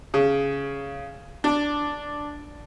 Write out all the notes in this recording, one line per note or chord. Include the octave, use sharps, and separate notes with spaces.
C#3
D4